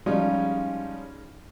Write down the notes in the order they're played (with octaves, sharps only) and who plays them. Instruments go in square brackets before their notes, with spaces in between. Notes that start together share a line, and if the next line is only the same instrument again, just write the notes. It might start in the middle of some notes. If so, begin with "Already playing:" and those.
[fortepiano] F3 G3 G#3 C#4 D#4 F4